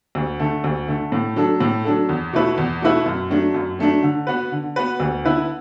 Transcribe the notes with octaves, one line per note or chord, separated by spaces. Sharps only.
D2
D3 A3
D2
D3 A3
A2
F#3 D4 A4
A2
F#3 D4 A4
E2
B2 A3 E4 B4
E2
B2 A3 E4 B4
F#2
F#3 A3 D4
F#2
F#3 A3 D4
D3
B3 F#4 B4
D3
B3 F#4 B4
D2
D3 B3 E4 B4